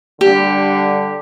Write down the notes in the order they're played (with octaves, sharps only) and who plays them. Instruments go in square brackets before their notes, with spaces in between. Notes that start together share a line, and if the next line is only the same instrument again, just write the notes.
[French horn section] D3 G3 D4 [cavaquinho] G4